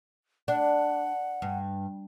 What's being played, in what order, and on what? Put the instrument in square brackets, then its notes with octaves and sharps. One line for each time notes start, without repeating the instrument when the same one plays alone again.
[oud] D4 [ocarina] F#5
[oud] G2